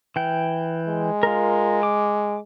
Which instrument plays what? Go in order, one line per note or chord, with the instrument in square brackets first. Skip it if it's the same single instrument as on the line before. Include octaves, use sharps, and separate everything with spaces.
[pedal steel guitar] E3 G5
[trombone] G#3
[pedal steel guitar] F4 A#4
D6